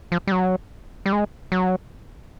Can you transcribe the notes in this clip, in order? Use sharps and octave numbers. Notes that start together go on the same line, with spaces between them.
F3
G3
F#3
G3
G#3
F#3